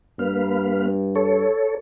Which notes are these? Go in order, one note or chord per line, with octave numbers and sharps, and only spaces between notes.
G2 A#3 B4 F5
A4 C#5